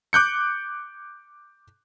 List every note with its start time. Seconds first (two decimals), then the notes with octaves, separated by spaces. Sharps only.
0.13 D6 F#6 G6 C#7